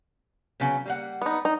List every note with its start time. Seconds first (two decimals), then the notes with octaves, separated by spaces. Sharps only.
0.60 C#3 F#3 B3
0.86 G3 A#3 F#5
1.22 B3 D#4
1.45 D#4